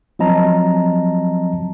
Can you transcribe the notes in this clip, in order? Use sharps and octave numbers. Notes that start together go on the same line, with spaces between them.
F3 F#3 C4 D#5 A5 A#5